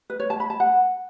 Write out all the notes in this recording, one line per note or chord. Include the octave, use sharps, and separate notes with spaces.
B4
C#5
A5
B5
A5
F#5